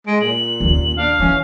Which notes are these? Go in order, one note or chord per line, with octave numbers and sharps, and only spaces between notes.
G#3 D7
A#2 F#7
D#2 C#3
D4 F5
E3 C#4